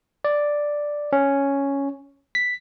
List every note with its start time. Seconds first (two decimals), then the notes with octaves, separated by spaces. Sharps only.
0.24 D5
1.13 C#4
2.35 B6